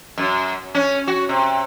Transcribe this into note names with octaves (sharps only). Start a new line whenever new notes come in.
F#2
C#4
F#4
C3